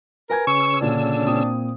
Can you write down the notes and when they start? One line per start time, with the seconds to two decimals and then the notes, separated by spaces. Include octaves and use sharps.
0.30 A#4 B4 G#5 G#6
0.47 C#3 C#4 C#6 E6
0.81 A#2 D3 D4
1.26 A#2 C4 D#6